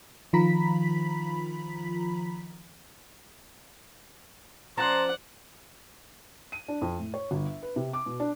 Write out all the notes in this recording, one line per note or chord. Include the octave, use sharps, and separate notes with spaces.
D#3 F3 F4 A#5 B5 B6
F3 C#4 D5 F#5 A5 A#5 C6
D#7
D4
F2
A2
C#5
G1
E5
B4
C3
D6
B2
D4